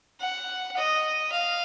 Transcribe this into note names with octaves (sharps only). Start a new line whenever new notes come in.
F#5
D#5
F5